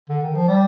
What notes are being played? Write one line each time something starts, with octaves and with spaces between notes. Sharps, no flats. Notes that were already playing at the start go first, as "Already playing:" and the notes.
D3
D#3
F3
G3